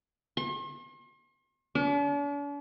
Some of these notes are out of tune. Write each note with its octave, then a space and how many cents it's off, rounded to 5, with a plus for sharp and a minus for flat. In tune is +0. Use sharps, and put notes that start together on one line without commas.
C6 +45
D4 -45